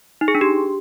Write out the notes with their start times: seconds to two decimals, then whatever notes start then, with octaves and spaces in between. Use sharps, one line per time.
0.21 D#4
0.28 G#4
0.35 D4
0.41 G4